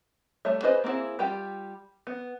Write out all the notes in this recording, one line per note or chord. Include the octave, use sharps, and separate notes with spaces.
G3 A3 C#5 E5
F4 G#4 B4 C5 D#5
A#3 C4 D4 E4 G#4
G3 F4 G4 G5
B3